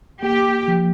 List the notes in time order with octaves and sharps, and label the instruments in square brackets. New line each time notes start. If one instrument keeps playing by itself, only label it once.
[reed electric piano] A#3 [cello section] G4
[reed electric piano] F3